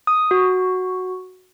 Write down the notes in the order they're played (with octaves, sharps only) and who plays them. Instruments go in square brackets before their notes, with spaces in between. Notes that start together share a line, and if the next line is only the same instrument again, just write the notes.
[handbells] D#6
F#4